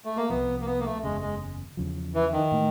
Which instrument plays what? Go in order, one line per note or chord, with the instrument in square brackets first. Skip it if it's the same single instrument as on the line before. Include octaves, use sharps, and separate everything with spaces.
[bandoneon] A3
A#3
[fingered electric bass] C2 C3 F3 [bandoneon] B3
[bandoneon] A#3
B3
A#3
A3
[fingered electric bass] F#1 E2 C#3 [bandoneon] G#3
[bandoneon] G#3
[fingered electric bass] E2 C#3 F3
[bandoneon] E3
D#3
[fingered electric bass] A2 E3 A3